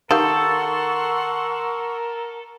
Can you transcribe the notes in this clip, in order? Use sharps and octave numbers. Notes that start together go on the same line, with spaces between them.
D#3 G4 A4 A#4 F5 F#5 C6 C#6